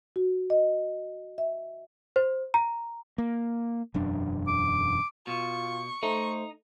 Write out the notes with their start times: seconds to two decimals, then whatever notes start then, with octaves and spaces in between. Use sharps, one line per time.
0.16 F#4
0.50 D#5
1.38 E5
2.16 C5
2.54 A#5
3.18 A#3
3.94 E1 F#2 D4
4.48 D6
5.27 B2 F4 C#6
6.03 A3 D#4 C5